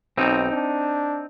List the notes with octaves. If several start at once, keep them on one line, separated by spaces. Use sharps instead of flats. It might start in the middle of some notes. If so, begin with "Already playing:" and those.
B1 C4 D#4
D4